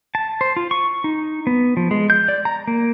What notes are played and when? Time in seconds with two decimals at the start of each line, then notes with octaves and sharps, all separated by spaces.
0.15 A5
0.41 C5
0.56 F4
0.71 C#6
1.04 D#4
1.47 B3
1.77 F3
1.91 G#3
2.10 G6
2.28 D5
2.45 A#5
2.67 A#3